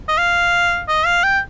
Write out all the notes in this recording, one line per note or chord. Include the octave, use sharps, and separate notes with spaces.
D#5
F5
D#5
F5
G5